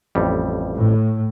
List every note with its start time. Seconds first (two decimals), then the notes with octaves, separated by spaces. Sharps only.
0.15 A1 F2 G3
0.76 A2